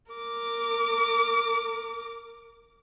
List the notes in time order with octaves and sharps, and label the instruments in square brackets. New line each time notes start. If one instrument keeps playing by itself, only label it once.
[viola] A#4 D6